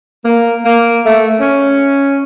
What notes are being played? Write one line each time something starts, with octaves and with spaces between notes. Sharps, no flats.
A#3
A#3
A3
C#4